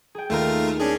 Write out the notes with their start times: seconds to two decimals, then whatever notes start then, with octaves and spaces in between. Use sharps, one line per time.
0.15 G#4 G5
0.30 D#2 A3 F4 A#4
0.80 C#4 D4 G#4